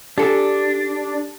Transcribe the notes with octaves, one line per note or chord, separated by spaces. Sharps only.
D4 G4 A4